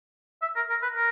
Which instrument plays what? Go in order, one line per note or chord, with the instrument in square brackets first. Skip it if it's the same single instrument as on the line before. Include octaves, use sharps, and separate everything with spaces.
[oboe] E5
A#4
A#4
B4
A#4